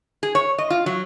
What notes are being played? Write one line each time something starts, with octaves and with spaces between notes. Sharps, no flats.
G#4
C#5
D#5
F4
F#3